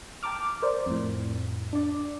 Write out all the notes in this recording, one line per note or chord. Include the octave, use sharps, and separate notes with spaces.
G5 A5 A#5 D6 F6
A#4 C5 D5
F2 A2
D4 D5